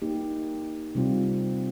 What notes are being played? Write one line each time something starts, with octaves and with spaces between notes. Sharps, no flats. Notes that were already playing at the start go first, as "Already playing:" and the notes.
A#3 D#4 G4
C3 G3 C4 F4